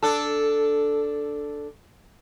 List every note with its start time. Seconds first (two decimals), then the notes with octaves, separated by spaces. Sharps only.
0.03 D4 A4